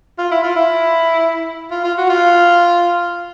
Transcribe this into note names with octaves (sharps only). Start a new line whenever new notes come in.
F4
E4
F4
E4
F4
F4
F#4
F4